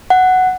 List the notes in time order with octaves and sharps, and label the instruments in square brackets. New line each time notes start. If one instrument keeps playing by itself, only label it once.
[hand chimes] F#5